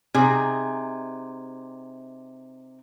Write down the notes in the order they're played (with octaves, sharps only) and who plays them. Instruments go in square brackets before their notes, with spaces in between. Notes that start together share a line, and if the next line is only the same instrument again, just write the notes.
[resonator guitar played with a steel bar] C3 D#4 G#4